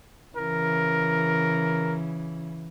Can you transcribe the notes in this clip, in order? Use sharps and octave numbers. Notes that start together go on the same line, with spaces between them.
C#3 E3 A#4